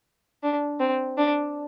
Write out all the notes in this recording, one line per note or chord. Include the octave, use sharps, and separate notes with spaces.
D4
C4
D4